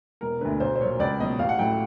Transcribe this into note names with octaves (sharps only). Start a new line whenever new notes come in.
E1 A#4
D2 D3 B4
B1 C5
C5
A#2 F#3 C#5
C#2 D5
B2 F#3 D#5
A1 F5
F#5
A2 F#3 G5